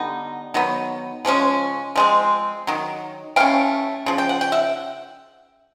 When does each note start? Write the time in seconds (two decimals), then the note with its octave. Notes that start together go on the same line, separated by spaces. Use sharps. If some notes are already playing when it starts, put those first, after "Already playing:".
Already playing: D3 G3 B3 D#4
0.54 D#3 F#3 B3
1.25 C#3 F3 G#3 C#4
1.96 F3 G#3 C4
2.67 D#3 F#3
3.36 E3 A3 C#4 F5 G5
4.06 C#3 F3
4.18 G5
4.29 F#5
4.41 G5
4.52 E5 F#5